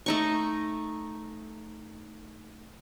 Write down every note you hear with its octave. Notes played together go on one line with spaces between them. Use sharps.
A3 D#4 C#6